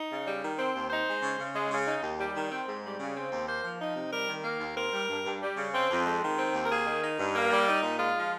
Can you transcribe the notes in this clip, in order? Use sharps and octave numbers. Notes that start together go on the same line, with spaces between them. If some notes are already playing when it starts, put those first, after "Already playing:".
Already playing: D#4
C#3
G3
D#3
C4
D#2
D#4 C5
G#3
C#3
C#3
G#3
C#3
D#4
D#2
G3
D#3
C4
G#2
G3
C#3
C4
D#2
A#3 C5
F3
D#4
C3
G3 A#4
D#3
A#3
D#2
C4 A#4
G3
G2
G2
G3
C#3
C4
F2
G#3
D#3
C4
D#2
A#4
A#3 G#4
D#3
D#4
G2
A#3
G3
D#4
A#2
G#3 F4
F3